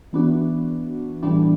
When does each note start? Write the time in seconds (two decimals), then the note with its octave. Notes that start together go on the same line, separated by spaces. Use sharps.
0.13 E3 B3 D4 F#4
1.22 A2 E3 G3 B3 D4